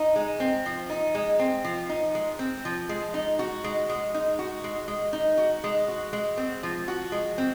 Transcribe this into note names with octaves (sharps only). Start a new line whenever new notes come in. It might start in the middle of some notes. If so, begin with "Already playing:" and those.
Already playing: D#4
G#3
C4
F3
D#4
G#3
C4
F3
D#4
G#3
C4
F3
G#3
D#4
F#4
G#3
G#3
D#4
F#4
G#3
G#3
D#4
F#4
G#3
F#4
G#3
C4
F3
F#4
G#3
C4